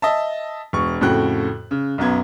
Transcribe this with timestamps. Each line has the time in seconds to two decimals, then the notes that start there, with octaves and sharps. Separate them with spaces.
0.02 D#5 E5 A5
0.73 E1 C#6
1.01 F2 A2 C#3 F#4 G5 F#6
1.71 C#3
1.98 B1 F#2 B3 G#6